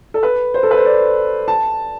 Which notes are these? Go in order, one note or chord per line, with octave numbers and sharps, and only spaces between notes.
A4
B4
C5
A4
B4
C5
D5
A5